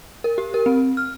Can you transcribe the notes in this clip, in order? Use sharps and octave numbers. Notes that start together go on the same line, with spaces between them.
A#4
G4
A#4
C4
F6